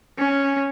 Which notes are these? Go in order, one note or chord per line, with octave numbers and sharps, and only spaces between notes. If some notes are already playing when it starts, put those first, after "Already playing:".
C#4